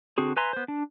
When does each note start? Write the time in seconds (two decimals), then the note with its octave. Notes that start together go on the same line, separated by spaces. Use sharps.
0.18 D3 C4 F#4 G#4
0.37 B4 E5 G#5 A#5 C6
0.53 B3 C5
0.68 D4